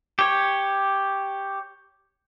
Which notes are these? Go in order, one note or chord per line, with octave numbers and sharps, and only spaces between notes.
G4 C#5